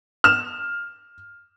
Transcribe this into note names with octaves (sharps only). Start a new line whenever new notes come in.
F6 E7